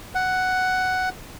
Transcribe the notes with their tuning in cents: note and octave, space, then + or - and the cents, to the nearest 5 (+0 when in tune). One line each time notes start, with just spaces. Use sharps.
F#5 +5